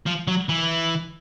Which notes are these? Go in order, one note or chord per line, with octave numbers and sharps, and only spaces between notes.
F3
F#3
E3